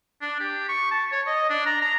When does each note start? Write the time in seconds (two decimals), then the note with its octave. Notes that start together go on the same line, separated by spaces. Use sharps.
0.21 D4
0.40 G4
0.69 C#6
0.91 A5
1.12 C#5
1.27 D#5
1.50 D4
1.66 A#5
1.82 A#5